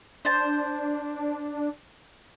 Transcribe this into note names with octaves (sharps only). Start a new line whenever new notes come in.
D4 C5 A5